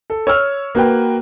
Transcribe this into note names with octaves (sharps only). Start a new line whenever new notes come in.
A4
C#5 E6 F6
A#3 F#4 B4 G5